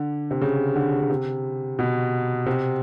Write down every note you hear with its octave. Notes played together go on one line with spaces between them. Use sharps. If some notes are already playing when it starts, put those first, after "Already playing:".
Already playing: D3
C3
C#3
D3
C#3
C3
B2
C3